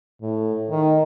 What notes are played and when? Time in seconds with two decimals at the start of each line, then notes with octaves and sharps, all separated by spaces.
0.21 A2
0.70 D#3